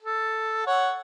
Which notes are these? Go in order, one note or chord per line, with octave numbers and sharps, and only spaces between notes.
A4
C#5 F#5